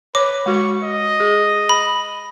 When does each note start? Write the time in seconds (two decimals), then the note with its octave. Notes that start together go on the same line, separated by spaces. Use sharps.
0.15 B4 C#5 D6
0.46 G#3 F#4 C#6
0.84 D#5
1.20 G#4
1.69 B5